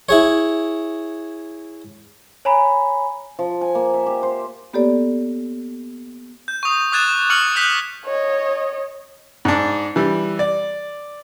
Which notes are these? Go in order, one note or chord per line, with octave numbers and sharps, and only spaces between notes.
E4 G#4 C#5
C#5 G#5 A#5 B5
F3
G#5
A#3
E5
G4
C5
A#3 B3 G4 A4 C#5 D5
G6
C#6 D#6
D6 D#6 F#6 G#6 A6 E7
C#6 F6 C#7 F#7
D#6 F#6 G6 B6
C#5 D#5
G#2 D4
E3 G3
D5